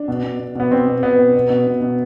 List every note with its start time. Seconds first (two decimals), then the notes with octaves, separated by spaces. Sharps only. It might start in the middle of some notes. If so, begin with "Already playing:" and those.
Already playing: D4
0.08 B2
0.24 B2
0.39 B2
0.55 B2 B3
0.71 B2 C4
0.87 B2
1.03 B2 B3
1.19 B2
1.35 B2
1.50 B2
1.66 B2
1.82 B2